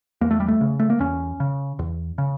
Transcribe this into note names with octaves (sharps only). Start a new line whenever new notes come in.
E2 A#3
A3
G3
A3
C#3
A3
A#3
E2 C#4
C#3
E2
C#3